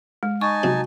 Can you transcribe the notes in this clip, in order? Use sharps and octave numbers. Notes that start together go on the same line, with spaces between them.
G#3
D#4 G#5 A5 C#6
C3 F#3